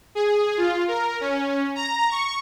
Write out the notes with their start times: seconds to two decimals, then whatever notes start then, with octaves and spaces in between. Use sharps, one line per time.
0.15 G#4
0.57 F4
0.88 A#4
1.21 C#4
1.75 A#5
2.10 C#6